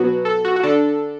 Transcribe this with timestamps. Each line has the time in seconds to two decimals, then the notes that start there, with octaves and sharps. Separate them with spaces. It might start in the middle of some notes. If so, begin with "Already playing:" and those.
Already playing: B2 F#3 B3 F#4
0.25 A4
0.45 F#4
0.56 F#4
0.63 D3 D4 A4